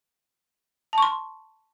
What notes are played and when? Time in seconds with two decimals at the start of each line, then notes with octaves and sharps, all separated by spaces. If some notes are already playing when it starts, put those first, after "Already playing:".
0.93 A5
0.98 C#6
1.02 C6